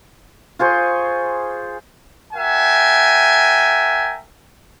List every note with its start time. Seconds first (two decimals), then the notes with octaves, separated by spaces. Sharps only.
0.59 F4 G#4 C5 C#6
2.34 F#4 A#4 E5 G5 G#5